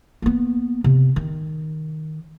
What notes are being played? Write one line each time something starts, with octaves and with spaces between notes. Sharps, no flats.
A#3 B3
C3
D#3